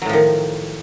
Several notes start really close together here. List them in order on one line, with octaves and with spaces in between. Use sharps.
F#3 A2 F3 D#3